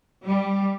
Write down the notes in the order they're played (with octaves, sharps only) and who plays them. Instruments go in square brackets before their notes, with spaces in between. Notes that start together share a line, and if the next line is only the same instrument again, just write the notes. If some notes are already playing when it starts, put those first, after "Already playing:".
[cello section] G3